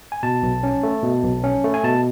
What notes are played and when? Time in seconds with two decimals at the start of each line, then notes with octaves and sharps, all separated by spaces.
0.12 G#5
0.23 B2 A5
0.43 B1
0.63 C#4
0.83 A3
1.03 B2
1.24 B1
1.44 C#4
1.64 A3
1.74 G#5
1.84 B2 A5